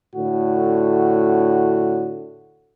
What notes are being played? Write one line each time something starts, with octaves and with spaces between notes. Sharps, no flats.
A2 D3 F#4